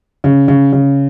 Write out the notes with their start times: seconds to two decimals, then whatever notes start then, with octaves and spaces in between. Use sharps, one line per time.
0.24 C#3
0.48 C#3
0.73 C#3